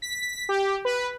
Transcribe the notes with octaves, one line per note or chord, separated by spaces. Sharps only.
B6
G4
B4